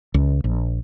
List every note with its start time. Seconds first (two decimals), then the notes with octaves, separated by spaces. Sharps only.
0.14 C#2
0.44 A#1